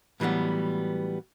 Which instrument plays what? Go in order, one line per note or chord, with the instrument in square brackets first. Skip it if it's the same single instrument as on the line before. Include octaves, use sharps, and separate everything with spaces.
[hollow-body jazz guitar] A2 E3 F#3 G3 B3